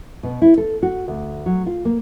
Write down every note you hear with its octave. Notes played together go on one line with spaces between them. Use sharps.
B2
E4
A4
F#4
D2
F#3
F4
A#3